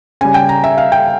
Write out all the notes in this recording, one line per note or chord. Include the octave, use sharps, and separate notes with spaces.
C#3 G3 G#5
G5
A#5
E5
F5
G5